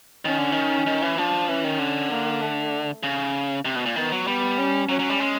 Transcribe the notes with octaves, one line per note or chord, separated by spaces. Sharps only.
D#3 C#4
D3
D#3
D#3
E3
F3 D4
E3 C#4
D#3
D3
A#3
A3
C#3
C3
B2
A#2
D#3 B3
F#3
G3 B3
C#4
F#3 C#4
F#3
G3
G#3